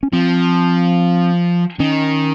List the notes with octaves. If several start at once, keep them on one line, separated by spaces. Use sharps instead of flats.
C#4
F3 C4
D#3 C#4